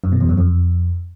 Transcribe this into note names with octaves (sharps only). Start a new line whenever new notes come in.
F#2
B2
E2
F#2
F2